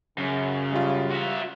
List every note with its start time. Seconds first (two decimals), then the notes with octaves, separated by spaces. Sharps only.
0.18 F#2 C#3
0.73 G3 F4
1.10 F#4 E5